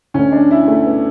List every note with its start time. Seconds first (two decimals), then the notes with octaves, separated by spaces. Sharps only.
0.14 D2 D3 C#4
0.32 D4
0.51 E4
0.68 A3
0.86 B3